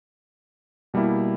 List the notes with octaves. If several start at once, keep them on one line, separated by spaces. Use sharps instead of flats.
B2 G3 A#3 E4